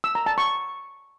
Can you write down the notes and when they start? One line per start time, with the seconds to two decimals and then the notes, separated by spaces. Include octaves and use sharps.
0.04 E6
0.15 A#5
0.26 A5
0.38 C#6